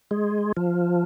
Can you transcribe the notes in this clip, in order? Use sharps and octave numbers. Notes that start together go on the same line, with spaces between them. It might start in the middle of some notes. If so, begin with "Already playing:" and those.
G#3
F3